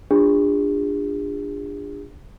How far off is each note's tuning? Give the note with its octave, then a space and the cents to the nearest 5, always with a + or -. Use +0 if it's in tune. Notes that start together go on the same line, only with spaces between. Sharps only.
D4 +0 F4 -10 G#4 -45